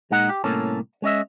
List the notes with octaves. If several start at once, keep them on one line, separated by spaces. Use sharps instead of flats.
A#2 G#3 D#4 F#5
G4
C2 A2 A#3 C#4 A4
G#3 C#4 D#5 E5